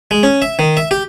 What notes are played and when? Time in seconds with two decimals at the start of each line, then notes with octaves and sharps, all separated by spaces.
0.11 G#3
0.23 C#4
0.42 E5
0.59 D#3
0.77 E5
0.91 G4